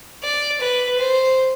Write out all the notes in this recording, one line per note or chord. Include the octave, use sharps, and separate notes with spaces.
D5
B4
C5